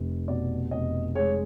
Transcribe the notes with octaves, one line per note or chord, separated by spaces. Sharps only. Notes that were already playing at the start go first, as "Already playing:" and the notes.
Already playing: F1
B2 D5
F1 D#5
G#3 C#5